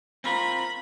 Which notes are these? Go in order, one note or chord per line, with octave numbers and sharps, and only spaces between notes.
C4 F4 A#4 B5